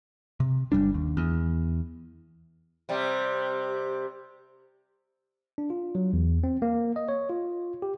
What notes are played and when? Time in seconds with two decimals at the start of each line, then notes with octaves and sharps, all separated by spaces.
0.40 C3
0.72 G1 G2 G3 D4
0.94 D#2
1.17 E2
2.89 C3 G3
5.58 D4
5.70 F4
5.95 F#3
6.13 E2
6.44 C4
6.62 A#3
6.96 D#5
7.09 C#5
7.29 F4
7.82 G4